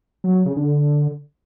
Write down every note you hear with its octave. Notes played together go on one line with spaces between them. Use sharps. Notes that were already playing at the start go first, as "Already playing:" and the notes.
F#3
F#3
C#3
D3